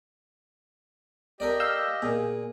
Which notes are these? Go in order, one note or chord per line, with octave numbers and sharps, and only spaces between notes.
G4 A4 A#4 D5 D#5
F5 E6 G6
A#2 G#4